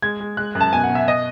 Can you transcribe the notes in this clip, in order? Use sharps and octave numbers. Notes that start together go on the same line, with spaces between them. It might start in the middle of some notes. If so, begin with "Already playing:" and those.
G#3 G#6
G#3
G#3 F#6
F#2
A5
B2 G#5
F#5
B2
E5
D#5